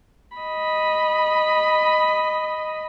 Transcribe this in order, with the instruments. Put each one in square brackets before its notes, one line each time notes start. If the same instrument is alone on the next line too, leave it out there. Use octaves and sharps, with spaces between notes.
[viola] D#5 B5